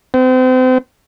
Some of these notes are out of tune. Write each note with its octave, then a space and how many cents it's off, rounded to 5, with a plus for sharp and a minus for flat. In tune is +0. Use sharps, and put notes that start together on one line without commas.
C4 -35